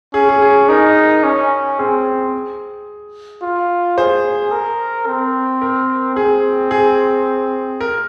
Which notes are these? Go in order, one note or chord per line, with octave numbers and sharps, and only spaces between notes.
C#4 G#4
G#4
G#4
D#4 A#4
C#4
C4 G#4
F4
G#4 C5
A#4
C4
A#4
C4 G#4
G#4
A#4